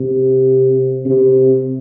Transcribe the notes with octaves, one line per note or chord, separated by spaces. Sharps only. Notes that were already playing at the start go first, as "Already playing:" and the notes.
Already playing: C3
C3